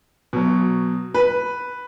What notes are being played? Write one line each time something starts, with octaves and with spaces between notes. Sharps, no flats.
B2 F#3
B4